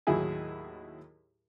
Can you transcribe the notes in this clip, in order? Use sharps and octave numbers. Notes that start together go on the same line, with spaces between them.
D#2 A2 F#3 E4 G#4 G#5